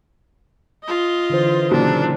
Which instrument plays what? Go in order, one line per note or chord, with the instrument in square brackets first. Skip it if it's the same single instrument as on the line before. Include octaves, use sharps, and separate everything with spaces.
[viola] F4 D#5
[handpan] D3 E3 C5
[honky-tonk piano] A#2 C#3 F#3 [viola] D4 [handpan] D#4